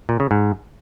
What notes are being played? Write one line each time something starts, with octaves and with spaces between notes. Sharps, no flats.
A#2
C#3
G#2